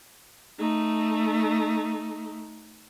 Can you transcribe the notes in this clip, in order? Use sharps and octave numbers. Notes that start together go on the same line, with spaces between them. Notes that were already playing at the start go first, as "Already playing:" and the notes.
A3 D#4